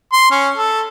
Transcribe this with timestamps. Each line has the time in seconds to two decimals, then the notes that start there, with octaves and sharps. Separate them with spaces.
0.13 C6
0.31 C#4
0.57 A4